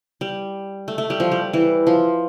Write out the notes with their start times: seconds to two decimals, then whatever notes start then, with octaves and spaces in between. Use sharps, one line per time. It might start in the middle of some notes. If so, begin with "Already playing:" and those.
0.21 G3
0.88 A3
0.98 A3
1.10 G3
1.20 F3
1.31 G3
1.53 E3
1.87 F3